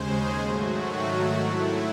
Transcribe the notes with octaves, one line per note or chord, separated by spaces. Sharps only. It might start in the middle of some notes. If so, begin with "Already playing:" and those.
Already playing: D#2 C#3 G#3 G#4 C5
G#2 D#3 F#3 A3 F#4
C3 F#3 A3 E4